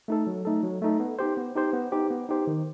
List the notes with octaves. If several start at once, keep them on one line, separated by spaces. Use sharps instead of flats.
A3 D#4 A4
F#3
A3 D#4 A4
F#3
A3 D#4 A4
B3
D#4 G4 C5
B3
D#4 G4 C5
B3
D#4 G4 C5
B3
D#4 G4 C5
D#3